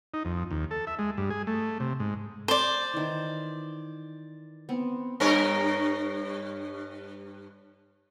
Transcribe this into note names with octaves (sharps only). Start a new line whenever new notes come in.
D#4
F2
D#2
A4
E5
G#3
G2
G#4
A3
C3
G#2
C5 D5
D#3 E3
B3 C4
G2 A#4 C#5